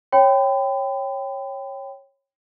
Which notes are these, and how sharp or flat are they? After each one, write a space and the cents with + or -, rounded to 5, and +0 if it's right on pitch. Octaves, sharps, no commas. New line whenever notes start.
C#5 -15 G5 +0 B5 +40